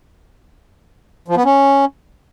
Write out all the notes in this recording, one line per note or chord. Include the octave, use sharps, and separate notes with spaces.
F3
B3
C#4